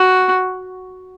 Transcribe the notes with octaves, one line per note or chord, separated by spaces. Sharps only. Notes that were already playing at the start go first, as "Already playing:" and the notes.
Already playing: F#4